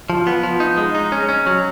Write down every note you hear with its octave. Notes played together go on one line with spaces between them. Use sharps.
F3
B3
F3
D#4
G#3
D#4
C#4
C#4
F#3